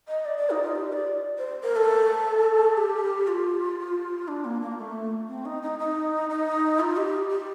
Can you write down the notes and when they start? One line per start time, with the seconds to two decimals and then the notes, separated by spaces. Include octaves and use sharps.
0.08 D#5
0.25 D5
0.38 D5
0.50 D#4
0.63 F4
0.75 G4
0.92 D5
1.38 C5
1.63 A#4
1.76 A4
2.77 G4
3.28 F4
4.28 D4
4.45 A#3
4.62 A#3
4.78 A3
5.28 C4
5.45 D#4
5.62 D#4
5.79 D#4
6.30 D#4
6.80 F4
6.97 G4
7.30 G4